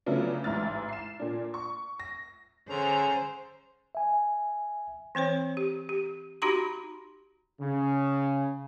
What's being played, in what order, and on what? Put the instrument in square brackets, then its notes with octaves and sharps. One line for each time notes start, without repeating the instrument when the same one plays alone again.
[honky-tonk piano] C#3 F3 F#3 A3 B3 D4
A1 G#2 E4 F6 A6
C7 E7
A#2 D4
C#6
A#6
[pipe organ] D3 A#5 [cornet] C#4 [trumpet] G#4 [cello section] C5
[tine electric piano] E5 G#5
[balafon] E3 C4 C5 C#5
G4
G4
D#4 F#4 G4 A#5 C6
[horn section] C#3